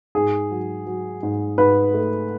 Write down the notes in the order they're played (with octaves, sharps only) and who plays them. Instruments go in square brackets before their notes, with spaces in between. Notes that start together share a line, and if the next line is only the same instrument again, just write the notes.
[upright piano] G#2 G#4
F#3
F#3
G#2
G#2 B4
A3